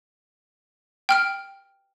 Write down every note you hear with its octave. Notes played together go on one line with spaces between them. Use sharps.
G5 F6 D7